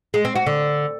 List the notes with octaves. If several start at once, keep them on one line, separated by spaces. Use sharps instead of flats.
G#3
C4
F#4
D3